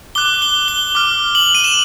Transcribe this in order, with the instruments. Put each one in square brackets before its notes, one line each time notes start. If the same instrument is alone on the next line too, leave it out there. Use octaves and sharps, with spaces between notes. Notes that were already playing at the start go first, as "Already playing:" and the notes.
[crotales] D6 F#6 G7
G7
G7
D6 F6
F#7
D#7
E7